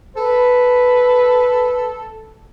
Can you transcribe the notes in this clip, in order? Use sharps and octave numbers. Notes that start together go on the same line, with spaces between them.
A4 B4